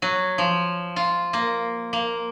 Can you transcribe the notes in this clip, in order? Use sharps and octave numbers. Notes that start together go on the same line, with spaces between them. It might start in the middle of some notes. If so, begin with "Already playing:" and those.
F#3
F3
F4
A#3
A#3